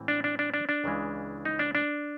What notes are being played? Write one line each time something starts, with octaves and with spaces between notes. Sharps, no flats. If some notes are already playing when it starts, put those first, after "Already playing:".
Already playing: A2 E3 G#3 C4
D4
D4
D4
D4
D4
C#2 C#3 E3 G#3
D#4
D4
D4